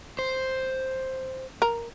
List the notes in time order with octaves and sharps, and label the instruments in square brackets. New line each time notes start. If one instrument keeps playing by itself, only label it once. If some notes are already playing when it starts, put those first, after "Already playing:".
[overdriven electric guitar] C5
[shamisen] A#4